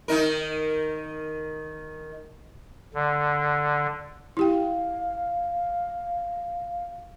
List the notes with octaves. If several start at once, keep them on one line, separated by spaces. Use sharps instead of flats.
D#3 D#4 A#4
D3
E4 G4 F5 G5